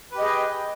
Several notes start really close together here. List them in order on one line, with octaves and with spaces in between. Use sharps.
B4 G4 D#5 G#4 G5